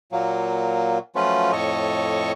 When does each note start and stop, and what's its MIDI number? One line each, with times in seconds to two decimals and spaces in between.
0.12 0.98 46
0.12 0.98 54
0.12 0.98 58
1.16 1.52 53
1.16 1.52 54
1.16 1.52 57
1.16 1.52 61
1.16 1.52 65
1.16 1.52 71
1.52 2.32 41
1.52 2.32 45
1.52 2.32 69
1.52 2.32 73
1.52 2.32 75
1.52 2.32 85